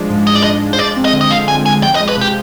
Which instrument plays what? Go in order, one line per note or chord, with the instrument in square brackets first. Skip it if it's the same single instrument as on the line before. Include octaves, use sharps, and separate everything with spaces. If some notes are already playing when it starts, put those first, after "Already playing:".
Already playing: [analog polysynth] F3 G#3 D4
G#2
[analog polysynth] G#2 [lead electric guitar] D#5
[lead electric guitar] D5
[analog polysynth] F3 [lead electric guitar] D#5
[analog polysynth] G#3
[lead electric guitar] C5
[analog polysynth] F3 [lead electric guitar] D5
[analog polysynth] C4
[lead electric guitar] D#5
[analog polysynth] D3
[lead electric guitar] D#5
[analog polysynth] D3 [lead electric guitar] F5
[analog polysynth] F3 [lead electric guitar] G#5
[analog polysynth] C4 [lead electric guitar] G#5
[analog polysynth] F3 [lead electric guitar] G5
[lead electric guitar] D#5
[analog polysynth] G#3
[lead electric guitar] B4
[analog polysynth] C3 [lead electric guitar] G4